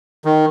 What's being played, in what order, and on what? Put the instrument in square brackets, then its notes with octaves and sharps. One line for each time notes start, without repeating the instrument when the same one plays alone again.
[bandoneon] D#3